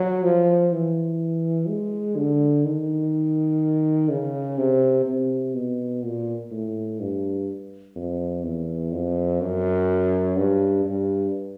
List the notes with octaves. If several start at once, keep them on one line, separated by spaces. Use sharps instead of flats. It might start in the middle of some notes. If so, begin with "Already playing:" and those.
Already playing: F#3
F3
E3
G#3
D3
D#3
C#3
C3
C3
B2
A#2
A2
G2
F2
E2
F2
F#2
G2
G2